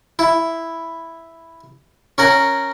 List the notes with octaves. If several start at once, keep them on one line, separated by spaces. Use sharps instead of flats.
E4
C#4 A#4 F#5